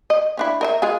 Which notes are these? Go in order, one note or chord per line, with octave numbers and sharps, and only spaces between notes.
D#5
C#4 D4 E4
A#4 D#5 E5
G#3 F4 G#4